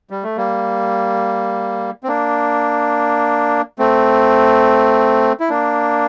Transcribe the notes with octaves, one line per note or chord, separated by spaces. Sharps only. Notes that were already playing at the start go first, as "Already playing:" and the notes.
G3
A3
G3 A#3
C4
A#3 D4
A3 C4
E4
A#3 D4